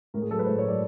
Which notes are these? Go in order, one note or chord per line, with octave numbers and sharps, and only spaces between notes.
A2 A#4
G#4
F#3 A4
B4
A2 C5
C#5
F#3
D5